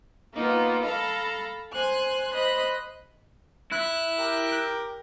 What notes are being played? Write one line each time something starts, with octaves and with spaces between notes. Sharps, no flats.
A#3 B3 D#4 F4
A4 F5 A#5 B5
C5 G#5 F#6
C5 D#5 B5 F#6
E4 F#6
G4 A#4